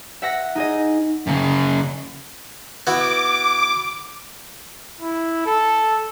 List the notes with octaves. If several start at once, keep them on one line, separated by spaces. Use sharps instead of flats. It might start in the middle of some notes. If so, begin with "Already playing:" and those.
E5 F#5 A#6
D#4 G#4 D#5
F#2 C#3
B3 E4 F#4 D6
E4
A4